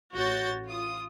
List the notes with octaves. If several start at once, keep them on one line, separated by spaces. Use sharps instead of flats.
A1 F#4 C#5 G6 A6
F4 D#6